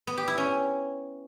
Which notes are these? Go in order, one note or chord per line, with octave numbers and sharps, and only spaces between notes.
B3
G4
E4
C#4